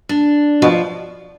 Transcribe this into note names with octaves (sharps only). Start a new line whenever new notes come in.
D4
B2 F3